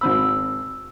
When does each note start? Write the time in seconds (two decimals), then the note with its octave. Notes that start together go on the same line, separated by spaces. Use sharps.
0.01 G#1 C4 B5 E6